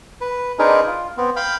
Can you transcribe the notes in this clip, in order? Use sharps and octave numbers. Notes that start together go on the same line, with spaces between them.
B4
C4 D4 D#4 G#4 A#4 B4
F4
B3 C4
F5 G5 B5